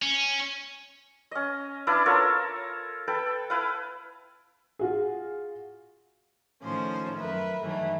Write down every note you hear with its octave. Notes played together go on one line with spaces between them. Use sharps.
C#4
C#4 D#5
D4 E4 B4 F5
F4 A4 A#4 C#5
A4 B4 G5
E4 B4 F5
F4 F#4 G#4
A2 D#3 F3 C#4 C5
F#2 A#4 B4 E5
G2 D#3 E3 F#3 A3